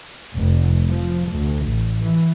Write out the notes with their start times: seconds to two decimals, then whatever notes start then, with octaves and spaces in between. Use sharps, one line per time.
0.36 F1
0.88 F3
1.31 D2
1.66 A1
2.02 E3